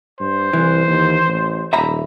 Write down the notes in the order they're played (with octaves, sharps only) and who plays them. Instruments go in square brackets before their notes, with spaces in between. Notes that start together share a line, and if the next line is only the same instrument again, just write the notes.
[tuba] G2 [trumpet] C5
[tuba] C2 [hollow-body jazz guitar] E3
[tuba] D#2
A1
[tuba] D#1 [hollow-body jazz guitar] E5 A#5 B5